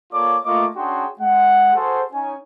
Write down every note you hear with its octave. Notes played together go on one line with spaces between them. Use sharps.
A#3 F4 A4 C#5 D5 D6
A3 A#3 F4 D#5 C#6 D6
C#4 D4 F#4 G#4 G5 C6
G#3 F#5
F#4 G#4 A4 C5
C#4 D#4 G#5